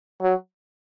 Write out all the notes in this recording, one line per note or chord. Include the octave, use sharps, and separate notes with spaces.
F#3